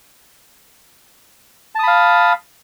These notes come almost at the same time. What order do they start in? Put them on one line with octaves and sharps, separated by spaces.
A5 D#6 B5 F5